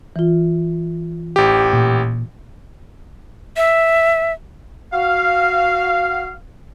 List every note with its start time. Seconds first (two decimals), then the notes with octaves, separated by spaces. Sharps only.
0.16 E3 F4
1.36 A1 G4
1.73 A#2
3.57 E5
4.93 F#4 F5